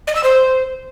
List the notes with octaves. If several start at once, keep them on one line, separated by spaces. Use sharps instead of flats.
D#5
E6
C5